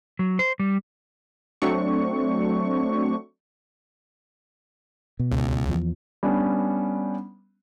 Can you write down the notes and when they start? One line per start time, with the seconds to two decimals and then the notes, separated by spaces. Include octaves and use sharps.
0.19 F#3
0.39 C5
0.59 G3
1.62 F#3 A3 C4 D4 C#6
5.19 B2
5.32 C#2
5.68 E2 F3
6.23 G3 B3 C#4 D4